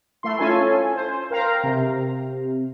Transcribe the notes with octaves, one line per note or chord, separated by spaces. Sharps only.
A3 E4 C6
C#4 F4 A4 G#5
C5
A#4 F5 G5 A#5
C3